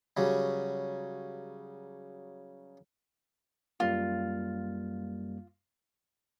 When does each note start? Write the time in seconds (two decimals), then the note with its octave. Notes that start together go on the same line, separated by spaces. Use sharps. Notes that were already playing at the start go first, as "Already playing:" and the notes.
0.17 C#3 F#3 G3
3.80 F#2 G3 A#3 F4